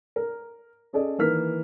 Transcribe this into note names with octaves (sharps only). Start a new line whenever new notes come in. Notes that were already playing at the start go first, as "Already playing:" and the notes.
A#4
C#4 G#4 A4 D5 D#5
D#3 E3 A#3 F6 B6